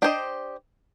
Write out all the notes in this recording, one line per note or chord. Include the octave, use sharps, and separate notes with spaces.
D4 G4 C5 D#5